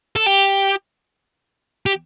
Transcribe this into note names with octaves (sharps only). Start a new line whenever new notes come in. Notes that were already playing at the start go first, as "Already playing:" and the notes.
A4
G4
G4